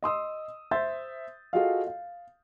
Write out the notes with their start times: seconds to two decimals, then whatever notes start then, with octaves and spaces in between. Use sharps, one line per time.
0.03 D#5 C6 D#6 E6
0.71 C5 E5 C6 G6 A6
1.53 F4 F#4 G#4 A4 D#5 F5
1.87 F5